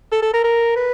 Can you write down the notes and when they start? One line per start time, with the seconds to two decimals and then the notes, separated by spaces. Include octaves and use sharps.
0.12 A4
0.22 A4
0.34 A#4
0.44 A#4
0.76 B4